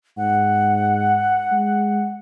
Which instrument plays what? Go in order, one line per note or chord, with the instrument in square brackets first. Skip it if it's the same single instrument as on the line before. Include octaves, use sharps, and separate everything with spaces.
[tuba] G#2 [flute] F#5
[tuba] G#3